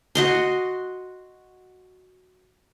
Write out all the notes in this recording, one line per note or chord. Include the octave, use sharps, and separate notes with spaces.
F#4 D#5 C6